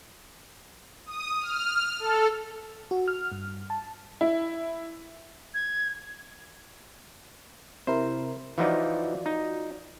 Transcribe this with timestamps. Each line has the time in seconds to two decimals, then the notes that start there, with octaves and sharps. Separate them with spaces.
1.06 D#6
1.41 F6
1.99 A4
2.91 F#4
3.08 F6
3.32 G2
3.70 A5
4.21 E4
5.54 G#6
7.87 C3 E4 A#4 C5
8.58 E3 F3 D#4 F4 F#4 D5
9.26 D#4